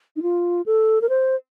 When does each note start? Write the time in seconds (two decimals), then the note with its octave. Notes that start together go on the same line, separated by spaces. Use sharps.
0.16 D#4
0.22 F4
0.66 A4
1.01 A#4
1.09 C5